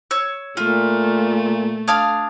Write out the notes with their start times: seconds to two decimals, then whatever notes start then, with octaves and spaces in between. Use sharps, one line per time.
0.11 C#5 E6
0.57 A#2 A3 F4
1.88 D4 F5 A5 D#6 F6 G#6